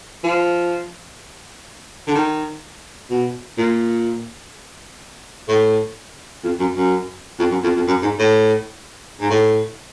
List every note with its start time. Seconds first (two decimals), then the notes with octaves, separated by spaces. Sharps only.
0.24 F3
2.07 D3
2.15 D#3
3.10 B2
3.58 A#2
5.48 A2
6.44 F2
6.59 F#2
6.75 F#2
7.39 F2
7.51 F#2
7.63 F2
7.75 F2
7.87 F#2
8.02 G#2
8.19 A2
9.20 G#2
9.30 A2